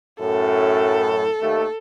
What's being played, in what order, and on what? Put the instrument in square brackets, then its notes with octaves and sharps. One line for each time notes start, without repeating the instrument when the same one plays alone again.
[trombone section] F#2 A2 [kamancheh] A4
[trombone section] D#2 A3